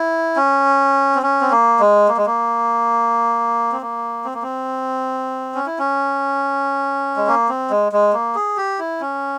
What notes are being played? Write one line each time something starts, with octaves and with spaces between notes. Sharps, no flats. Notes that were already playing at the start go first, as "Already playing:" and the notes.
Already playing: E4
C#4
C4
C#4
C4
A#3
G#3
A#3
G#3
A#3
C4
A#3
C4
A#3
C4
C#4
E4
C#4
G#3
A#3
C4
G#3
G#3
A#3
G#4
G4
E4
C#4